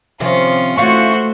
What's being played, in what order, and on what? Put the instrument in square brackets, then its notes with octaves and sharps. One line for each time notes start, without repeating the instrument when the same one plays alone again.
[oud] C3 D#3 F3 [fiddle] C#4 F4
[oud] E3 C#4 F4 [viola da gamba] A3 [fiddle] F#4 C5 [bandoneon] C#6